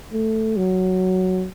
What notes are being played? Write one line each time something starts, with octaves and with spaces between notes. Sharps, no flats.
A3
F#3